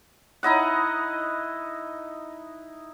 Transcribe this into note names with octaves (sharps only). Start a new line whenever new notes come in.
D#4 E4 D#5 F#5